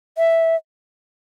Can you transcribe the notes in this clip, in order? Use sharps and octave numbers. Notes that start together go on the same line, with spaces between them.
E5